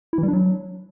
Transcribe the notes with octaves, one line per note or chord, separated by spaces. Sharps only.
E4
E3
G3
D4
F#3